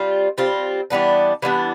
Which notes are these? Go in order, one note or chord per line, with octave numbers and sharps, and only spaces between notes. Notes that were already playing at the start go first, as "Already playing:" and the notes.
Already playing: G3 C4 F4
G3 C4 F4
E3 G3 B3 D4
E3 G3 B3 D4